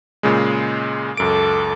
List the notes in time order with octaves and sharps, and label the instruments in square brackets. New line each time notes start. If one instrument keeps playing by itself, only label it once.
[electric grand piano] A#2 C#3 G#3
[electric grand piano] C#2 F#2 D7 [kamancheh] A4 D6